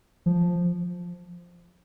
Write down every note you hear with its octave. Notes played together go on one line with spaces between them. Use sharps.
F3